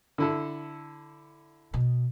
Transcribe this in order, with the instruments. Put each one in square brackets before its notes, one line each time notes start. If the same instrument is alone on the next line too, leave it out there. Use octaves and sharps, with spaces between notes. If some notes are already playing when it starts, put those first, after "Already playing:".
[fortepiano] D3 E4 A4
[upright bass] B2